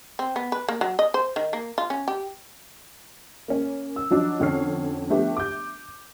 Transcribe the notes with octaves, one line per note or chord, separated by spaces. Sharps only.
C4
B3
B4
A#3
F#3
D#5
C5
D#3
A#3
F4
C#4
G4
A#3 C#4
E6
F3 F#3 D4 D#4
F2 D3 C#4 C#5 F6 C7
F3 A3 B3 D4 G4
D6 G6